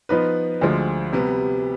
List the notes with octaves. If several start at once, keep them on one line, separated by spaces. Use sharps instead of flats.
F3 B3 D#4 B4
D2 D3 F3 G#3
C3 G3 B3